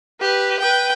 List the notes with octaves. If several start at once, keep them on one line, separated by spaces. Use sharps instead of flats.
G4 B4
B4 G5